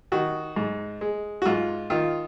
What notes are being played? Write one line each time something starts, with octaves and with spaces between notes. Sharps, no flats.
D#3 F#4
G#2
G#3
F#4
G#2 F4
D#3 F4